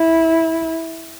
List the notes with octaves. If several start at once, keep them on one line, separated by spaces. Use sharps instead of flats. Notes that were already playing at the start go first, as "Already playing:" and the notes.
Already playing: E4